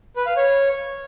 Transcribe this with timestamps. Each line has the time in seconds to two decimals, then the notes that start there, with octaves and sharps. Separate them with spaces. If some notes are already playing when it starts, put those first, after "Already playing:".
0.16 B4
0.27 F5
0.37 C#5